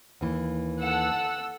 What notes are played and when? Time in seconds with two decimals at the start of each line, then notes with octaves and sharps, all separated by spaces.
0.21 D#2 E3
0.81 A4 F#5 E6